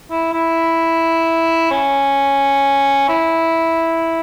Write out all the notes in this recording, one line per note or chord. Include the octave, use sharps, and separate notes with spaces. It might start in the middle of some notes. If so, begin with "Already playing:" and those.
E4
E4
C#4
E4